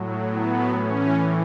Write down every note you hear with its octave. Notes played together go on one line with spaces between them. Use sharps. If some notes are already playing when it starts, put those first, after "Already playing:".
Already playing: A2 F#3
B3
A2 E3 C#4